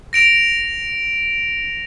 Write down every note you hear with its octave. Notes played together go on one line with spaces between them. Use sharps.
A#6 D7 F7